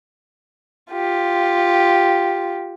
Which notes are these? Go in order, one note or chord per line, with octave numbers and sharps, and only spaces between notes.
F4 G4